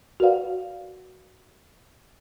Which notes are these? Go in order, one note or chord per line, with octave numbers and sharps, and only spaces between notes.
F#4 A#4 B4 D5 F5 F#5